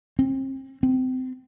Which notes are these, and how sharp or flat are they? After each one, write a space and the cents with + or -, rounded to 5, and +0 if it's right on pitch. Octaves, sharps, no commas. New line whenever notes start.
C4 +35
C4 -25